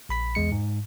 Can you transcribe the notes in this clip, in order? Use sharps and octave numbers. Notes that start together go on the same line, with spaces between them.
A#1 B5 B6
E2 G#3 C#7
G#2